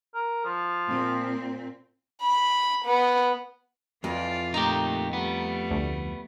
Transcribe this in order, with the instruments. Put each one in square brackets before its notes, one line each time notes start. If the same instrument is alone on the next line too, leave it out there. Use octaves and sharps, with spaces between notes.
[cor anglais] A#4
F3
[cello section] A#2 C4
[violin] B5
B3
[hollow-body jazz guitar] F2 [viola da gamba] E3 F4 D5
[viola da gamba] A#2 A3 [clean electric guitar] D#4 G4 [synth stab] A#5
[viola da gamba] G3 A3 [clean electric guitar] B3
[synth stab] D2